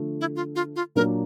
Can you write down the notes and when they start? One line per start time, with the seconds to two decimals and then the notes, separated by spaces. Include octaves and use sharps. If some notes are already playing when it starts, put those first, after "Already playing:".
Already playing: D3 F3 A3
0.21 E4
0.36 F4
0.55 F4
0.76 F4
0.95 A#2 F#3 A#3 D4 A#4